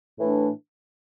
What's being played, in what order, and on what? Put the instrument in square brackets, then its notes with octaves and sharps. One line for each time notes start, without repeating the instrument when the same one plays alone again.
[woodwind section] A2 E3 A3 D4